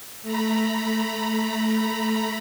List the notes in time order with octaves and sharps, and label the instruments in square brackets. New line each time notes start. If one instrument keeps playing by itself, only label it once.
[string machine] A3 A#5 B5